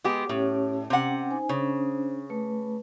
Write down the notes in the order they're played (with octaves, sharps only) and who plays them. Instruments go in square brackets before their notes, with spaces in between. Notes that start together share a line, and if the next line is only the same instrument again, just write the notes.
[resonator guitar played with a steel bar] G#3 B3 G4
[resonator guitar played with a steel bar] A2 [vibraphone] C#4 G4 C#5
[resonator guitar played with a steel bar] C3 F#5 [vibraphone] C#4 G5
[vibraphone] D#4 C5 G#5
[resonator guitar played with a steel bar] C#3 [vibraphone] C#4 D4 C5
[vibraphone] A3 B4